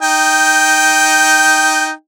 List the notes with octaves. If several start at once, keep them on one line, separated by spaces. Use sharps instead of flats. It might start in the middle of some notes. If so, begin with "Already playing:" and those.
D#4 G5